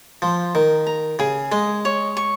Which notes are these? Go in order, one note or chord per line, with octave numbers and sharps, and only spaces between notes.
F3 C5
D#3 A#5
A#5
C#3 G#4
G#3 D#5
C#5
C#6